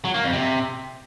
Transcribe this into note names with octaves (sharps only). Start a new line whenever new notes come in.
F#3
A#3
F2
C3